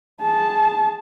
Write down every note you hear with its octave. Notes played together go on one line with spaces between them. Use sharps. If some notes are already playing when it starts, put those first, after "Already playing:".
G#4 A5